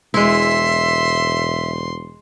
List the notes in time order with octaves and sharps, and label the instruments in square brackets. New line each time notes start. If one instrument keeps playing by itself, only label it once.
[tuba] E1 [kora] G#3 E4 [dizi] E5 [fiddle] C6